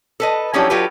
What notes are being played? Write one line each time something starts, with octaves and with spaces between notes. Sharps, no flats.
A4 B4 D#5
F3 F#3 C#4 D4 E4 G4
F#3 F4 G4 A4 B4